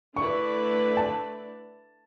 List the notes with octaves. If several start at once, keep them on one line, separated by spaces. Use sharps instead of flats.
D3 A3 E4 B4 D5 C#6
A5